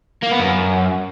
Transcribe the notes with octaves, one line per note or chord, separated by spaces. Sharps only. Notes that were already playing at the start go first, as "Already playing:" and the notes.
A#3
B3
F#2